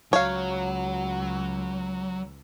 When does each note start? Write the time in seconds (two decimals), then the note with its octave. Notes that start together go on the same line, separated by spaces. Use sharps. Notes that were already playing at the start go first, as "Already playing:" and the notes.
0.13 C#2 F#3 C#5 F5